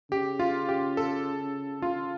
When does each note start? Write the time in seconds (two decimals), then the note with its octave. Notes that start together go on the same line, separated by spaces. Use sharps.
0.11 C#3 G4
0.40 F4
0.69 G4
0.97 A4
1.82 F4